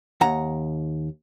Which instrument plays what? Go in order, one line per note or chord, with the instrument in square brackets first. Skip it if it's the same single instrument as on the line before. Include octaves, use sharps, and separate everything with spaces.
[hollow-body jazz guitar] D#2 F#5 A#5